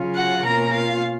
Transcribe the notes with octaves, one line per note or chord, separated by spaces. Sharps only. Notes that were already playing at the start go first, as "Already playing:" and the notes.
Already playing: C#3 F#3 C#4 F4
F#4 F#5
B2 A#3 C#4 F4 A#4 A#5
F4 F5